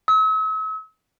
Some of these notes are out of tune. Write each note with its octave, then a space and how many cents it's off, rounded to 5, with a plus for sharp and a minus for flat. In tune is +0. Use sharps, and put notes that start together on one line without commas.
E6 -45